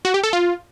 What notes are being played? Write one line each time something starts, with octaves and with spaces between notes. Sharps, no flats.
F#4
G4
A4
F4